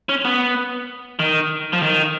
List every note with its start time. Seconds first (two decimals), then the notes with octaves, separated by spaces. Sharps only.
0.09 C#4
0.25 B3
1.19 D#3
1.73 F3
1.82 D#3